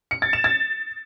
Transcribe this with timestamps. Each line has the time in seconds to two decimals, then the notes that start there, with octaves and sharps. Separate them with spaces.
0.11 C#7
0.22 A6
0.33 E7
0.44 A6